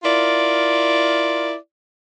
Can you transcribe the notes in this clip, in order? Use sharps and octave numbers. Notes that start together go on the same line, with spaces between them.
E4 F4 A#4 D5